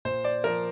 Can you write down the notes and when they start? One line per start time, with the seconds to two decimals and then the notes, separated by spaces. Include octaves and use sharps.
0.05 A#2 C5
0.24 D5
0.44 F3 A#4